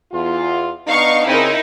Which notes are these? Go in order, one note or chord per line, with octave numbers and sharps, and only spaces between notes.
E2 F4
B3 D4 D#4 F5 C#6
C#3 C4 D#4 E4 A#4